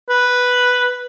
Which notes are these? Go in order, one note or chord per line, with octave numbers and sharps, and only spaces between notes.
B4